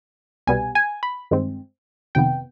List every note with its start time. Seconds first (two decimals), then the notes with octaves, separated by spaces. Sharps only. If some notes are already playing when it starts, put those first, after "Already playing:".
0.47 C2 B2 G3 B3 G#5
0.75 G#5
1.03 B5
1.31 G2 D#3 G#3 C4
2.15 F2 C3 D#3 B3 G5